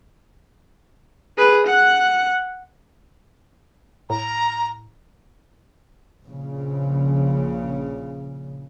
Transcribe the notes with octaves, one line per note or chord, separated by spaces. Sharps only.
G#4 B4
F#5 F#6
A2 A#5
A#1 C#3